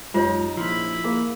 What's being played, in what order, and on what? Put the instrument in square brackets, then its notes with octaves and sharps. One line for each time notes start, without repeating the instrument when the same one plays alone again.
[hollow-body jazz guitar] F#2 G#3 [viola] D#4 [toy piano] F4 G4 C#5
[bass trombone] A#1 [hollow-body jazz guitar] F3 [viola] E4 B5
[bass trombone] A#3 [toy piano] G#4